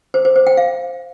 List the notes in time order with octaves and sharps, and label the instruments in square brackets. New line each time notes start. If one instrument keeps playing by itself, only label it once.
[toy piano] C5
C5
C5
G5
F5